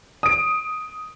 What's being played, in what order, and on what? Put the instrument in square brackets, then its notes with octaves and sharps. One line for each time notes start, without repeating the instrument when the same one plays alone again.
[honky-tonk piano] D#6 D7